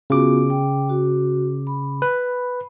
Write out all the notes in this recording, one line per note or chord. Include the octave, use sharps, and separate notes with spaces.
C#3 B3 F4 F#4 D6
G5
F#4
B5
B4